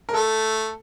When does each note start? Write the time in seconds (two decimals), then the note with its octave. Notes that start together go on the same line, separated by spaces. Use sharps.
0.09 A#4
0.13 A3 A4